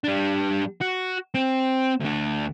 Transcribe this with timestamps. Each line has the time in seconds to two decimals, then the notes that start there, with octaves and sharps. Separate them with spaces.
0.04 G3 D4
0.81 F#4
1.34 C4
2.00 D2 D4